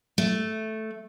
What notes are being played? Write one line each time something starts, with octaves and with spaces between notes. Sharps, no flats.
A3